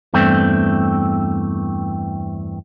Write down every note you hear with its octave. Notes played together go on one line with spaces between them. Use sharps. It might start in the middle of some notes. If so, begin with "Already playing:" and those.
E2 G2 A3 C4